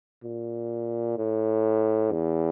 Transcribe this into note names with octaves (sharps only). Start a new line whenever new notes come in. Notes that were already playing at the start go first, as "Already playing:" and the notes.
A#2
A2
E2